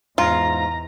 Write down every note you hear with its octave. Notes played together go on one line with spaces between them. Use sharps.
E2 G#2 F4 A#5